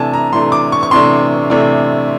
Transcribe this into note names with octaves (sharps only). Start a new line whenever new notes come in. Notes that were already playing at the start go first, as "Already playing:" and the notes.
Already playing: C3 E3 A3 D4 G#5 A5
A#5
C3 E3 A3 D4 C6
D6
C#6
C#6
C3 E3 A3 D4 C6
C3 E3 A3 D4